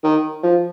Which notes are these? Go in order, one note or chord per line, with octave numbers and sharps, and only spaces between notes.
D#3
F3